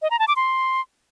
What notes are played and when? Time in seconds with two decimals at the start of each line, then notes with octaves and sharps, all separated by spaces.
0.02 D#5
0.11 A#5
0.19 A5
0.28 D6
0.36 C6